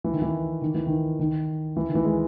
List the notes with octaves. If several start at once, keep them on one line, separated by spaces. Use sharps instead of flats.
E3
D#3
E3
D#3
E3
D#3
D#3
E3
D#3
E3
G#3